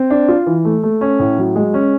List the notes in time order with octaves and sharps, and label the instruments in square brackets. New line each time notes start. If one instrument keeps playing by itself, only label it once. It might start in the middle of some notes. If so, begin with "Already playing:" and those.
Already playing: [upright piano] C4
D4
F4
E3
A3
A3
C#4
A2
F#3
G#3
C#4